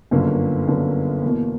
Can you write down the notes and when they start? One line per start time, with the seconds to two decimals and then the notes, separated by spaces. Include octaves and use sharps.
0.11 G1 F#2 D3 A#3
0.67 G1 F#2 D3 A#3
1.23 E2 B2 A#3